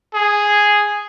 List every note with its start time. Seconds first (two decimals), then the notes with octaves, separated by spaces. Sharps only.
0.14 G#4